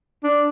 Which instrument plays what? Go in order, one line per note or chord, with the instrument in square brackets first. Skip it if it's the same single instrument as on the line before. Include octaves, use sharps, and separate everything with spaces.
[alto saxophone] D4